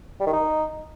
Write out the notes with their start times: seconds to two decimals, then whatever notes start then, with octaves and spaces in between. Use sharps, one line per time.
0.20 G3
0.27 D#3
0.33 D#4